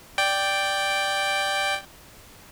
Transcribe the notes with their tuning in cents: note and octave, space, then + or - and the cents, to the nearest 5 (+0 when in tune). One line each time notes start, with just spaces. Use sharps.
D5 +0 G5 +0